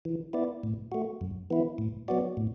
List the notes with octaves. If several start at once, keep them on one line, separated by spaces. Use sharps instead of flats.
E3
B3 E4 D5
A2
A3 F#4
F#2
E3 B3 E4
A2
F#3 B3 F#4 D5
A2